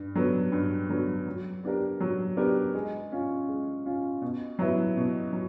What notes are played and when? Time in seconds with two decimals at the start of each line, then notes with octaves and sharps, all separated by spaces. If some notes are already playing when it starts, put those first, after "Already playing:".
Already playing: G2
0.15 D3 F#3 B3
0.52 G2
0.89 D3 F#3 B3
1.27 F#3
1.63 B3 D4 G4 A#4
2.00 F#3
2.37 B3 D4 G4 A#4
2.74 G#3
3.12 C#4 F4
3.48 G#3
3.86 C#4 F4
4.22 B2
4.59 F#3 B3 E4
4.97 B2
5.33 F#3